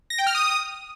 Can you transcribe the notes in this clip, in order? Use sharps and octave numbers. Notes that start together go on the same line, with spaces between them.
A#6
G5
F6
D#6